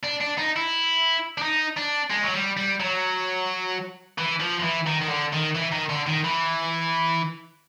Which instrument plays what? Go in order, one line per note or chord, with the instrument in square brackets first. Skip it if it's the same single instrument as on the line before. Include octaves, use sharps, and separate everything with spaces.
[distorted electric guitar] D4
D4
D#4
E4
D4
D#4
D4
G#3
F#3
G3
G3
F#3
E3
F3
F3
E3
D#3
D#3
D3
D#3
E3
D#3
D3
D#3
E3